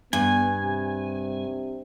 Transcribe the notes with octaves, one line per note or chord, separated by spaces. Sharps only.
G2 B3 G#5
C3